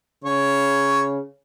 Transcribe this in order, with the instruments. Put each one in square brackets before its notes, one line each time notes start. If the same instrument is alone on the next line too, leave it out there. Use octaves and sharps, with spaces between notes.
[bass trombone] C#3 [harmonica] C#5